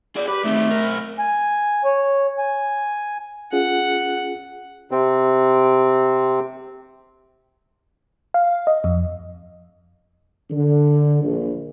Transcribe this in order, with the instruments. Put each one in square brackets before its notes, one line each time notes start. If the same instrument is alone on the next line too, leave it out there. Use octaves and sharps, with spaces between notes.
[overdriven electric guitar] G#4 D5
[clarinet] G4 [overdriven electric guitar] B4
[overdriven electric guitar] D#3 C4 [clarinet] A3
[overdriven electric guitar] B1 A#4
[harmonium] G#5
C#5
G#5
[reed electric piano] C#4 F4 G#4 [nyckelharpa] F#5
[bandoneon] C3 C4
[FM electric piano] F5
D#5
F2
[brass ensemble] D3
A#1